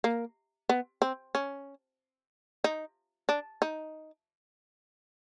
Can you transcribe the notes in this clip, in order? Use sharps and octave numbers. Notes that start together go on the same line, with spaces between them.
A#3
B3
C4
C#4
D#4
D4
D#4